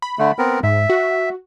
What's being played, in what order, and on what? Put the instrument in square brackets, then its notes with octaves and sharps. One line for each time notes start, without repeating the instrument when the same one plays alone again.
[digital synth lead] B5
[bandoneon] D3 A3
B3 C4 A#4
[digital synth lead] G#2 [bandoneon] E5
[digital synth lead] F#4